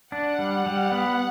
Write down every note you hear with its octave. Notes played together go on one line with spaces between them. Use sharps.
D4 F#5
G3
G3
B3